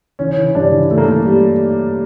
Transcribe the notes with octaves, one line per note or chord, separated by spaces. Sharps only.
E3 C#4
E3
G2 D4
E3
E3 A3
A#3
E3 A3
G3